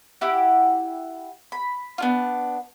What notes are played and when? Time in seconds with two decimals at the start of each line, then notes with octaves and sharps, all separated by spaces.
0.21 E4 G4 F#5
1.52 B5
1.98 B3 D4 F4